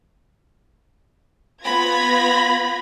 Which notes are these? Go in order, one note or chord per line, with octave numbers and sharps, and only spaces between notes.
B3 F4 B5 G#6 A#6